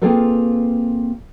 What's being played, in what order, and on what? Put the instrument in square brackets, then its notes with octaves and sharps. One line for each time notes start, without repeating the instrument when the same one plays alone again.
[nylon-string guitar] A#3 C4 F4 G#4 A4 B4